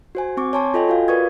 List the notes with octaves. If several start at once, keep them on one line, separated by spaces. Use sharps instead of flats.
F#4 C5 G#5
C4 C#6 D6
C#5 G#5 A5 C6 C#6
F4 A4 D#5 G5 G#5
F4 F#4 F5
A#4 B4 D5 C#6 D#6 G#6